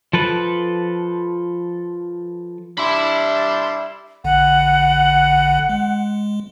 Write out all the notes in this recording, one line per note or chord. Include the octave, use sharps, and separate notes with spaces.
F3 A4 B4
G3 D4 E5 B5 C6
A#1 D3 F#5
G#3